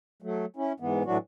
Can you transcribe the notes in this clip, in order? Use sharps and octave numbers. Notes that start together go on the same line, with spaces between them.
F#3 A3
C#4 E4
G#2 E3 B3
A2 E3 F#3 D4 F#4